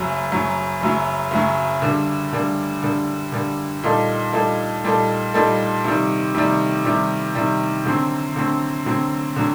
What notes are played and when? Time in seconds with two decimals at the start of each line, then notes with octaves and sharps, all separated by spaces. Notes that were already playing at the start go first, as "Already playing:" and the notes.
Already playing: F#1 F#2 F#3
0.31 F#1 F#2 F#3
0.81 F#1 F#2 F#3
1.31 F#1 F#2 F#3
1.82 D3 G3 A#3
2.33 D3 G3 A#3
2.82 D3 G3 A#3
3.32 D3 G3 A#3
3.83 A#2 G3 A#3 D#4 A4
4.33 A#2 G3 A#3 D#4 A4
4.84 A#2 G3 A#3 D#4 A4
5.34 A#2 G3 A#3 D#4 A4
5.84 C3 D#3 G3
6.35 C3 D#3 G3
6.85 C3 D#3 G3
7.35 C3 D#3 G3
7.86 D3 F#3 C4
8.36 D3 F#3 C4
8.86 D3 F#3 C4
9.36 D3 F#3